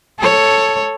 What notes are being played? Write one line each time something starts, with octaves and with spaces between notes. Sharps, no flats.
A4 C#5